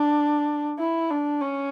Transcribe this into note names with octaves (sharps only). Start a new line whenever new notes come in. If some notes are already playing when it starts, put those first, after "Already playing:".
Already playing: D4
E4
D4
C#4